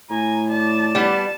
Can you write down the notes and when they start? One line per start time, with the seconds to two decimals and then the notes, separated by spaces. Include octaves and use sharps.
0.10 A2 G#5 A#5
0.50 D5 A5
0.95 G3 B3